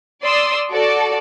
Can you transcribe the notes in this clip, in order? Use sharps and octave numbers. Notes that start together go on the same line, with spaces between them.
D5 C6 D#6 E6
F#4 A4 D5